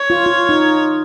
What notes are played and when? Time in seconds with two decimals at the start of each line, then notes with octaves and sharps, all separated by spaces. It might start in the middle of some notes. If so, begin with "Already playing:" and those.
Already playing: C#5
0.10 F4
0.26 F4
0.49 D#4